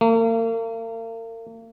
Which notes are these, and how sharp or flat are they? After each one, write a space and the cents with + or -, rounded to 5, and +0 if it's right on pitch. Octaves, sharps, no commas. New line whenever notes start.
A#3 -40